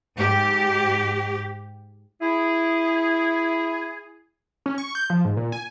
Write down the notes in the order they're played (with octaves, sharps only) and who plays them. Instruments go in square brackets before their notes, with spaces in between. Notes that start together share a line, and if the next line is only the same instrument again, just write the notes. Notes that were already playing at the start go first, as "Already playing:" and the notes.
[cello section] G#2 G4
[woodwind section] E4 G#4
[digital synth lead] C#4
C#6
G6
F3
G#2
A#2
G#5